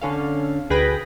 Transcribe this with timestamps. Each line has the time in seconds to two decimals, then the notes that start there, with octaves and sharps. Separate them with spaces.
0.01 D3 C#4 A4 F5
0.70 D2 G#4 B4 G5 B5 A#6